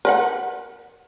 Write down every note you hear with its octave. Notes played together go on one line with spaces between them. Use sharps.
A#4 B4 F#5